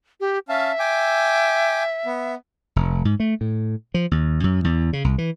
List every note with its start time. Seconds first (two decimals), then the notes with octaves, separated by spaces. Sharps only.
0.20 G4
0.49 C#4 E5 F5 A5
0.79 G5 G#5 D6
2.06 B3
2.76 F1
3.05 G#2
3.20 A3
3.41 A2
3.94 F3
4.11 D#2
4.44 F#2
4.64 E2
4.93 C#3
5.04 C2
5.18 E3